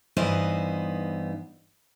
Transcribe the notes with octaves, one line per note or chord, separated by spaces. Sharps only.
G2 E3 B3 D#4 C5